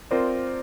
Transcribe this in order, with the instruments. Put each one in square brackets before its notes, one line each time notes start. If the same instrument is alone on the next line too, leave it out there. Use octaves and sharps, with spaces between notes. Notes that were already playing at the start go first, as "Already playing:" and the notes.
[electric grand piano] C4 F4 A#4 D5 [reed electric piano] C5